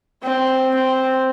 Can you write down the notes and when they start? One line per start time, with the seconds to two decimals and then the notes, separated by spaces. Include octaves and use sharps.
0.23 C4
0.74 C4